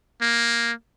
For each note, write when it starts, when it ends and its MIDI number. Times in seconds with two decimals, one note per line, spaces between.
0.22 0.72 58